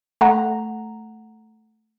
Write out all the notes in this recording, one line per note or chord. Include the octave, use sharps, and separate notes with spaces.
A3 F#5 A#5